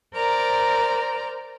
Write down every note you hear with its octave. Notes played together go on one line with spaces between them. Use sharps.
A#4 C5 D5 A#5